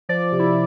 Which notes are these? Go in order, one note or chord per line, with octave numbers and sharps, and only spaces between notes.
F3 D5
C3
E4